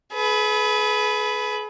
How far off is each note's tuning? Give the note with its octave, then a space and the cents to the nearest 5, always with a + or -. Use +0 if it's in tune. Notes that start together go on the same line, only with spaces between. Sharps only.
G#4 +40 B4 +0